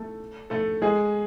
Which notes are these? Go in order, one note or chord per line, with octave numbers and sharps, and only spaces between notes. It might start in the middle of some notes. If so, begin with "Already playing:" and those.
Already playing: A3 A4
A3 A4
G#3 G#4